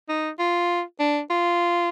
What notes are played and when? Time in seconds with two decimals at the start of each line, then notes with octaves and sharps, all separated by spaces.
0.09 D#4
0.39 F4
1.00 D4
1.30 F4